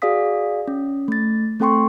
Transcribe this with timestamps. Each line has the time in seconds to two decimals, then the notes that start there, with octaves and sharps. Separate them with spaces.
0.02 F#4 G#4 D5 F5 D#6 B6
0.67 C#4
1.08 A3 A6
1.60 A3 C4 A4 G5 C6 C#6